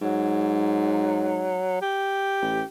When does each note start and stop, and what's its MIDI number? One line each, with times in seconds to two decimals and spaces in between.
0.02 1.58 44
0.02 1.77 54
1.81 2.64 67
2.42 2.62 33